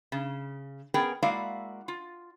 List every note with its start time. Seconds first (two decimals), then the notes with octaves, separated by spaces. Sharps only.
0.12 C#3
0.94 B3 C#4 G#4 A#4 G5
1.22 G#3 A#3 E4 F#4 D5 F5
1.88 F4